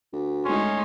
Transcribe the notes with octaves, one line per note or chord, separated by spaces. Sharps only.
D2
G#3 A3 C#4 D#4 C6